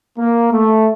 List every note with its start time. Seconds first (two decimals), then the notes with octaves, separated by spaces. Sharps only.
0.19 A#3
0.53 A3